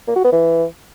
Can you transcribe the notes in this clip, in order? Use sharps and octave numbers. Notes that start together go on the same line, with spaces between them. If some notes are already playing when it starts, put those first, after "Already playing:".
A#3
F#4
B3
E3